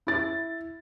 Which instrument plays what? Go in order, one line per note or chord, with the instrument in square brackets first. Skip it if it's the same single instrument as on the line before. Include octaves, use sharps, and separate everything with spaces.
[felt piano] E4 A6